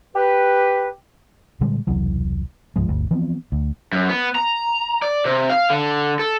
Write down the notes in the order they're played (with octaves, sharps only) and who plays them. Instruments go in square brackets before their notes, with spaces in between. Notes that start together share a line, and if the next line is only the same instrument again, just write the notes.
[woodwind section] G4 B4
[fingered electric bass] A#2 D3 G3 G#3
E1 C2 E3 F#3
C#2 G#2 F3 G#3
G1 D2
E3 F3 B3 C4
D2
[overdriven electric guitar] F#2
B3
A#5
D5
C3
F5
D3
A4